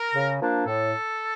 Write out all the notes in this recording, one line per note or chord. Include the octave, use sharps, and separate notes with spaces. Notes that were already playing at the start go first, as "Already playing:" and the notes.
Already playing: A#4
C#3
F3 A#3 D4
A2 A4